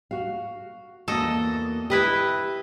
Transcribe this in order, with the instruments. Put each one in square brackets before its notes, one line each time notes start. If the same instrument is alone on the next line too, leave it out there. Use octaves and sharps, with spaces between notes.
[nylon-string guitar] F#4 F5
[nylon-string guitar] E2 A#3 F#4 [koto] A4 D#5
[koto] E4 B4 D#5 [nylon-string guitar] G4